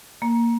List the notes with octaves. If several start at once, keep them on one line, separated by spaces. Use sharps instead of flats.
A#3